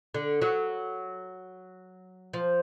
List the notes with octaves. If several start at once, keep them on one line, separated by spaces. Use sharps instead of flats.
D3
F#3
F3